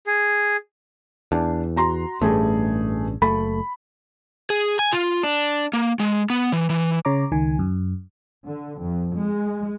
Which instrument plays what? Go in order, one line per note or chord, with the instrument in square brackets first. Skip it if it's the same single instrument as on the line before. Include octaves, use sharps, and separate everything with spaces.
[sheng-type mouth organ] G#4
[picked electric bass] E2 [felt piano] D4
[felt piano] F#4 A#5 C6
[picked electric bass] A1 G2 [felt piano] A3 G#4
[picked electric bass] F#1 A3 [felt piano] B5
[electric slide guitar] G#4
G#5
F4
D4
A#3
G#3
B3
E3
E3
[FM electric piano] C#3 C#5 A#5 D6
C#2 D#3 G#5
F#2
[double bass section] D3
F2
G#3